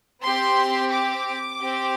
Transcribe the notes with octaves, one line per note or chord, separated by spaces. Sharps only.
C4 G4 C6
D6
C4 G4